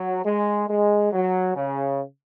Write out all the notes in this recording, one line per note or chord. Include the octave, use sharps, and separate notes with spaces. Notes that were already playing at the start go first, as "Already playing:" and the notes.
Already playing: F#3
G#3
G#3
F#3
C#3